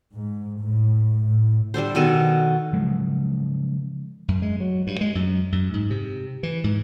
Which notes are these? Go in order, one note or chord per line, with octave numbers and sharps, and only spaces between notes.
G#2
A2
A2
G3 D4 A4 C5
B2 D#3 A4 G#5
C#3 F3 F#3 G#3
F#2
G#3
F#3
G2
G#3
F#2
F#2
G#2
C3
E3
G#2